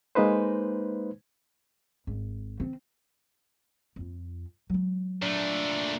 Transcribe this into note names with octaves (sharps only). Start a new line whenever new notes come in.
G#3 A#3 D#4 B4 C5
G#1
C4
F2 F4
F#3 G#3
A#2 A3 D4